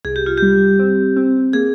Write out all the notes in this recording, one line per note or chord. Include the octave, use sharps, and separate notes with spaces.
C2 G#4
G4
F4
G3 G4
C4
C4
A#3 G#4